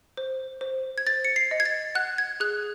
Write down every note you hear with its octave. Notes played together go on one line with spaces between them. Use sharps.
C5
C5
G#6
C5 A6
C#7
C7
D#5
G#6
A6
F#5 F#6
G#6
G#4 F#6